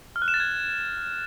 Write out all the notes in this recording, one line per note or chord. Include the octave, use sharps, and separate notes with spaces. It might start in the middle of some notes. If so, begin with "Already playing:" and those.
F6
F#6
E7
A6
G#6